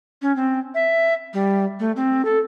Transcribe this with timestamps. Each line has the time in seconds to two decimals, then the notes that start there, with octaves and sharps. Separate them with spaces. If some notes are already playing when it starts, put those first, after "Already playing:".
0.22 C#4
0.36 C4
0.75 E5
1.33 G3
1.80 A3
1.96 C4
2.25 A4